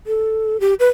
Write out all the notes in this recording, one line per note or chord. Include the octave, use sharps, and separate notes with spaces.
A4
G4
B4